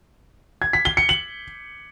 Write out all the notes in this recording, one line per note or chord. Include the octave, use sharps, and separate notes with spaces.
G#6
B6
G7
C#7
F#7